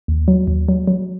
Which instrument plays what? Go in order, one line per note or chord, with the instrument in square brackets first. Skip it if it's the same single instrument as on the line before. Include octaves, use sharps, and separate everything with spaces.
[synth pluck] D#2
F#3
D#2
F#3
F#3